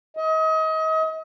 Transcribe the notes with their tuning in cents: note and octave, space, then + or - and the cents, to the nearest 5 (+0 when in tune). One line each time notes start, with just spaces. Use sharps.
D#5 +35